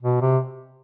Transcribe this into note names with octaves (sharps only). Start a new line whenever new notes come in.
B2
C3